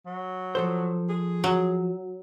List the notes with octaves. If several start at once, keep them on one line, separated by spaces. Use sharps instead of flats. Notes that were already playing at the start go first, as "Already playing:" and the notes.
F#3
F3 A4 C5
G#4
F#3